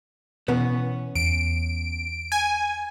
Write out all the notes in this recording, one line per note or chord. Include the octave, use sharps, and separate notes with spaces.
B2 E3 B3 C#4
E2 D7
G#5